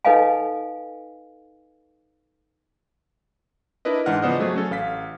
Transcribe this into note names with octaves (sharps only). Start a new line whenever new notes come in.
D#4 A4 B4 D#5 F5 G#5
D4 E4 A#4 B4 D#5
G#2 E3 D4 F#5 F6
C#3 F3 B3 C5 D5 D#5
F#3 A3 G#4
C#4 A4
A1 F5 B6